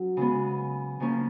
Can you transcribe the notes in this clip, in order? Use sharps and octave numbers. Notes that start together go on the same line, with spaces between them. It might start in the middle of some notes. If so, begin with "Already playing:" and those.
Already playing: F#3 C#4
C#3 G#3 B3
C#3 F3 A#3 C#4